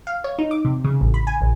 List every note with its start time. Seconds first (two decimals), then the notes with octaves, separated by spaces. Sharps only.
0.07 F5
0.24 C#5
0.39 D#4
0.51 D6
0.65 C3
0.84 C#3
1.01 A1
1.14 B5
1.27 G#5
1.41 A#1